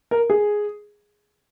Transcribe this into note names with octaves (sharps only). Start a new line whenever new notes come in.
A#4
G#4